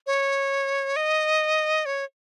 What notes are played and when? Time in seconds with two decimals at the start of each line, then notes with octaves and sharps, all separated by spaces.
0.07 C#5
0.96 D#5
1.86 C#5